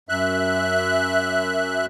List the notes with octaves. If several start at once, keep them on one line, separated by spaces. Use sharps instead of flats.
F#2 E5 F#6